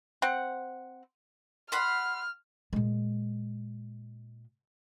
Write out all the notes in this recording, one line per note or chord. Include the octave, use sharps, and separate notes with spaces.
C4 F#5
F#5 B5 C6 F6
A#2 G#3